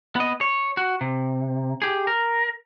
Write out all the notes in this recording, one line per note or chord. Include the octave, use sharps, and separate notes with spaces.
B3 D#5
C#5
F#4
C3
G4 G#4
A#4